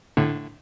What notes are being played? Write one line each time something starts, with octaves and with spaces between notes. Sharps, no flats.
A2 D3